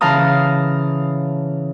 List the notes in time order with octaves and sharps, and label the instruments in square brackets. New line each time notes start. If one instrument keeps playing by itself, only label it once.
[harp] C#3 E3 F5 A5 A#5 D#6